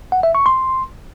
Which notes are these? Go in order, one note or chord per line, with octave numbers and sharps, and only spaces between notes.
F#5
E5
C#6
C6